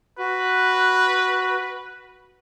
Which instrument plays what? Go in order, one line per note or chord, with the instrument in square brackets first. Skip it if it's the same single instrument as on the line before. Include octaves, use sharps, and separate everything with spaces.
[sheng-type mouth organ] F#4 [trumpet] B4